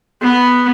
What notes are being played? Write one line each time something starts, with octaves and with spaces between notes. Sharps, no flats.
B3